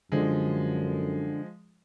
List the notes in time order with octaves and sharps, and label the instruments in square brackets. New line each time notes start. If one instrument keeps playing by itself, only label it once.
[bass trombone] F#2 [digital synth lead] D3 [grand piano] F3 G#3